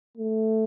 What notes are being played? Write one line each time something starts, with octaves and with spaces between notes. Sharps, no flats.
A3